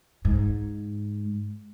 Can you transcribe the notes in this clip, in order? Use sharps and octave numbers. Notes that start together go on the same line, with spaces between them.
G#2